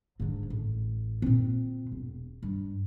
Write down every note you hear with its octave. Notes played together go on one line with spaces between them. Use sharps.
G#2 D3
A1
A#2 C4
E1
G2